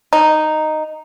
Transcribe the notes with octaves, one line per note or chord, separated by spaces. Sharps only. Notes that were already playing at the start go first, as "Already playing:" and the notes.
D#4